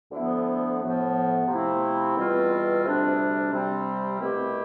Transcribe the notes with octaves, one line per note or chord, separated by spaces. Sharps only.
D2 D3 F3 B3 E4
A2 F3 B3
C3 F3 A3 C4 E4
E2 B2 G3 C4 F4
D2 C3 G3 D4
C3 G3 C4
C2 B2 A3 E4 G4